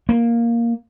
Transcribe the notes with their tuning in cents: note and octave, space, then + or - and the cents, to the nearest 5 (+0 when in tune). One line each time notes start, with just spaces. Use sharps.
A#3 +5